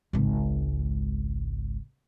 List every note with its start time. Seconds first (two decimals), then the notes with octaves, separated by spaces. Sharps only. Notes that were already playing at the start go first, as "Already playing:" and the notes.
0.13 G#1 C#2